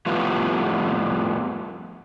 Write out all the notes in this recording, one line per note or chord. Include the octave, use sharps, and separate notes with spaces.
F2 A2 G3 B3 F4